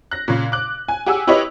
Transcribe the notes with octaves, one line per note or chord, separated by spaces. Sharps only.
F#6 A#6
A#2 C#3
D6 F#6
G#5
G4 G#4 F#5 G#5 E6
E4 G4 B4 C#5 D#5 E5